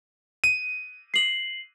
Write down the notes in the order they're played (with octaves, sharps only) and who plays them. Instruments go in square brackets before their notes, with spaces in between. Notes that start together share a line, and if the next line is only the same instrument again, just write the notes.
[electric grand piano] D#7
[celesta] C7 F#7